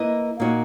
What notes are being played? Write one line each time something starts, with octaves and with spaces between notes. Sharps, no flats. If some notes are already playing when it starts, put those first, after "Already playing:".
Already playing: A#3 E4 B4 D#5
A#2 A#3 D#4 F#4 C#5